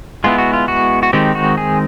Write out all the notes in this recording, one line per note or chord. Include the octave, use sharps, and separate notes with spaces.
G#3 B3 E4 F4
F#4
F4
F#4
F#4
D#3 G#3 C4 D#4 G4
F#4
G#4